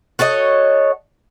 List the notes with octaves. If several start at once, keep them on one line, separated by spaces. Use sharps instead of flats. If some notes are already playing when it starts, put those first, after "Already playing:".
F#4 A4 C#5 D#5